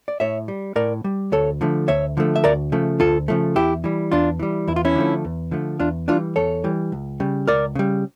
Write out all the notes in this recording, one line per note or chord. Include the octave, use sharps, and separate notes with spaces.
D5
A2 C#5 E5
G3
A2 A#4 D5
G3
D2 A4 C#5
D3 F3 A3
D2 C#5 E5
D3 F3 A3
E5
D2 A#4 D5
C#3 F3 A3
D2 F4 A4
C#3 F3 A3
E2 E4 G4
E3 G3
E2 D4 F4
E3 G3
E2 E4
F4
C#4 E4
D3 F3 A3
E2
D3 F3 A3
E2 D4 F4
E3 G3 D4 F4
E2 A4 C#5
E3 G3
C#2
C#3 G3
C#2 A#4 D5
C#3 G3